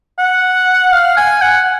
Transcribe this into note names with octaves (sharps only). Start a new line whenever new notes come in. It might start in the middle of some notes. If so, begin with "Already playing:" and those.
F#5
F5
G#5
F#5